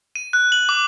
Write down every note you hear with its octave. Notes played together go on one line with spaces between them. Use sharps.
D#7
F#6
F#7
D6